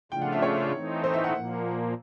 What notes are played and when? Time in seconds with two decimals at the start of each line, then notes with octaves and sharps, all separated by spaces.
0.12 C#3 F3 A3 D4 F4 G5
0.22 F#5
0.32 E5
0.42 C#5
0.73 E3 A3 C4 D#4
1.04 C5
1.14 E5
1.24 F#5
1.34 A#2 F3 A#3